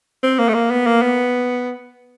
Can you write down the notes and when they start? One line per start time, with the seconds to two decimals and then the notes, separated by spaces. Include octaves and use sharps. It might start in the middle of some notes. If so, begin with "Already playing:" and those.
0.23 C4
0.39 A#3
0.48 A3
0.54 A#3
0.70 B3
0.86 A#3
1.02 B3